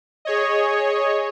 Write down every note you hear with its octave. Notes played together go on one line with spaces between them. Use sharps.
G#4 C#5 D#5